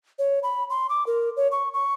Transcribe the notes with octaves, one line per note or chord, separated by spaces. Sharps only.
C#5
B5
C6
D6
A#4
C#5
C#6
C#6